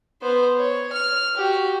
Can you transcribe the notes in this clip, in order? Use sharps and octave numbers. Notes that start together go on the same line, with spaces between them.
B3 C5
C#5
F6
F#4 G4